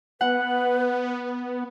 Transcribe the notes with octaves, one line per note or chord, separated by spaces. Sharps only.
B3 B4 F#5